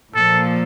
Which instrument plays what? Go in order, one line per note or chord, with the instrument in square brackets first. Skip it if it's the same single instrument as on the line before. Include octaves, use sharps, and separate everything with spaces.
[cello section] A#2 F3 A#3 [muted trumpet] A4